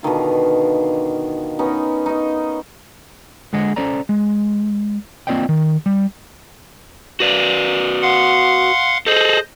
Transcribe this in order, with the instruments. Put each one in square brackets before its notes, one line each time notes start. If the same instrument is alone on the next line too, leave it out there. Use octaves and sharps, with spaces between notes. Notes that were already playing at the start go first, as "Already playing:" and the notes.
[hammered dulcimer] B2 D3 D#3 F4
B3 C#4 D#4 A#4
D#4 D#5
[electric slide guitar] D3 G#3 G#4 D#5 F#5
C#4 A4 C5 D5 A#5
G#3
A#3 C4 F4 D5 D#5 G5
D#3
G3
F#4 B4 D5
[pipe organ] F5 F#5 C6
[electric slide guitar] G#4 A4 [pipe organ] C5 D#5